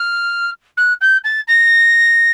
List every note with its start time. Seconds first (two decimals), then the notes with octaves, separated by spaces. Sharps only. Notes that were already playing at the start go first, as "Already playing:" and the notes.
Already playing: F6
0.77 F#6
1.01 G6
1.24 A6
1.47 A#6